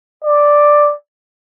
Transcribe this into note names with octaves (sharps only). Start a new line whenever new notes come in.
D5